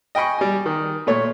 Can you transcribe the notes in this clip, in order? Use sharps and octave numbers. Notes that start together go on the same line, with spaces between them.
D#5 G5 G#5 B5 C#6
G3 G#5
D#3
A#2 A3 C#5 C#6